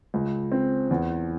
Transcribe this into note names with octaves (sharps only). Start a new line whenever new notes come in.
C#2
C4
E2